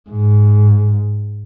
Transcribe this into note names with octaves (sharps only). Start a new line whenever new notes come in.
G#2